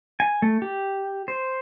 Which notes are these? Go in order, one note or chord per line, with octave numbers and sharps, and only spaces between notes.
G#5
A3
G4
C5